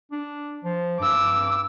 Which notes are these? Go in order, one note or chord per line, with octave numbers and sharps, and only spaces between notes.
D4
F3
G2 D6 E6